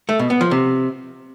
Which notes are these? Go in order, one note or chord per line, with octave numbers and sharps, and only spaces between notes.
A3
B2
B3
F3
C3